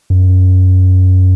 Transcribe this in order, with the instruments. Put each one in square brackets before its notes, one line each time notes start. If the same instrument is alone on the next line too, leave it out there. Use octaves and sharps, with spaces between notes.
[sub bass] F#2